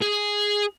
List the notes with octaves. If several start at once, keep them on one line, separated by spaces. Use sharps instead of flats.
G#4